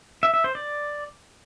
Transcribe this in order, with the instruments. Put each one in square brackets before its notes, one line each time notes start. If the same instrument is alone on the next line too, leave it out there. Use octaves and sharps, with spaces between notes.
[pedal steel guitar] E5
E5
C5
D5